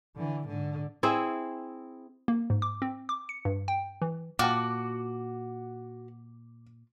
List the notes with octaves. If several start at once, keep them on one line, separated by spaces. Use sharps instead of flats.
D3 E3
G#2 D3
C4 E4 G#4
A#3
G#2
D6
C4
D6
C#7
G2
G5
E3
A#2 F4 F#4 G5 A5 D6